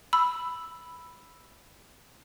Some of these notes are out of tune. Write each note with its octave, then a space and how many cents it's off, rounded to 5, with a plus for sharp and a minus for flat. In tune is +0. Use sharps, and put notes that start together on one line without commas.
B5 +0 E6 +0